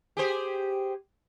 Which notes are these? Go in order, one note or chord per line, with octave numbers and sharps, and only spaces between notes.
G4 G#4 C5